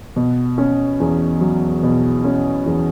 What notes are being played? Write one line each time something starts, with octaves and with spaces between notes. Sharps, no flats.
B2
C#4
E2
F#3
B2
C#4
E2